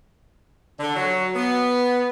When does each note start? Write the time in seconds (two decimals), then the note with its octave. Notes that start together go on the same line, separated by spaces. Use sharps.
0.80 D3
0.96 F#3
1.35 B3